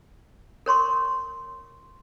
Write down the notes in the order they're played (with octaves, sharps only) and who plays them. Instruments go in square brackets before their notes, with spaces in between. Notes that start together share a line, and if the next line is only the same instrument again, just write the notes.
[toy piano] A#4 C#5 C6 C#6